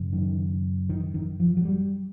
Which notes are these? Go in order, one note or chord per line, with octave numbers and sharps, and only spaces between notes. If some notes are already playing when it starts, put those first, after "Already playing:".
Already playing: F#2 C#3
D#3
D#3
D#3
F3
F#3
G3